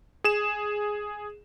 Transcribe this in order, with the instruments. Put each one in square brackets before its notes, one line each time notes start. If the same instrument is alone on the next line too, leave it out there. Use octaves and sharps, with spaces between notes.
[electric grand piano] G#4 E7